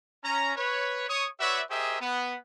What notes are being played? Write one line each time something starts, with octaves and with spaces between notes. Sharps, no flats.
C#4 A#5
B4 C#5
C#5 C#6 D#6
F#4 B4 C#5 D5 E5
G4 G#4 A#4 C5 D#5 E5
B3